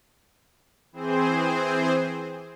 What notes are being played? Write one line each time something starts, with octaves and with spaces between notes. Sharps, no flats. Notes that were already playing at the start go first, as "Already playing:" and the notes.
E3 C4 G#4 C5